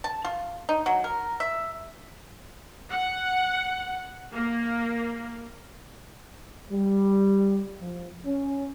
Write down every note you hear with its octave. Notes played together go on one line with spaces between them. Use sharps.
A5
F4
D#4
F#3
A#4
E5
F#5
A#3
G3
F3
C#4